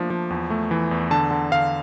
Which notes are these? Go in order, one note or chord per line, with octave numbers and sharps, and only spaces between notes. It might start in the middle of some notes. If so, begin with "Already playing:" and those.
Already playing: F3 A3 A#3 D4
F3
E2
A3
E3
E2
D3 A5
D3
D3 F5